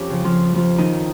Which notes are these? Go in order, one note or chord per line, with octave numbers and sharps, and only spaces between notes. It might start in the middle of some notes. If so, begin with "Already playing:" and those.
Already playing: F2 C#4 G4 C#5
C#3 F3
F3 F4
F2 F3 F4
D#3 D#4